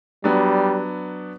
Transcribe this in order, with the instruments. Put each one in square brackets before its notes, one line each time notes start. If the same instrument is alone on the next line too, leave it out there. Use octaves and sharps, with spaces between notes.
[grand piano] F#3 B3 D4 [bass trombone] G3